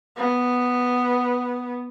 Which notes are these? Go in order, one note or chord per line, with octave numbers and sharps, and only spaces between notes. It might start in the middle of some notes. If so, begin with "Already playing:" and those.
B3